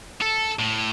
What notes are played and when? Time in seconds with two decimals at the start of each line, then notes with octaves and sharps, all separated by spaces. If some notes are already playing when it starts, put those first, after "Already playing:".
0.22 A4
0.59 A2